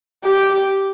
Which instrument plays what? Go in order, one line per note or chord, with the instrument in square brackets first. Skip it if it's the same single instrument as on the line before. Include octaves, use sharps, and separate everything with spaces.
[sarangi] G4